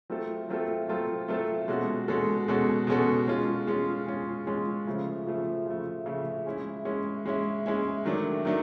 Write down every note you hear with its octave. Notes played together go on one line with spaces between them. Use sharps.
F#3 A3 C4 F4 A4
F#3 A3 C4 F4 A4
F#3 A3 C4 F4 A4
F#3 A3 C4 F4 A4
B2 G#3 C#4 F#4 A4
B2 G#3 C#4 F#4 A4
B2 G#3 C#4 F#4 A4
B2 G#3 C#4 F#4 A4
G#3 C#4 F4
G#3 C#4 F4
G#3 C#4 F4
G#3 C#4 F4
C#3 F3 A3
C#3 F3 A3
C#3 F3 A3
C#3 F3 A3
G#3 C#4 E4
G#3 C#4 E4
G#3 C#4 E4
G#3 C#4 E4
D#3 F#3 A3 D4
D#3 F#3 A3 D4